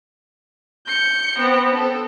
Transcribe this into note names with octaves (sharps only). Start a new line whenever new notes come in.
G6 C#7
B3 C4
A4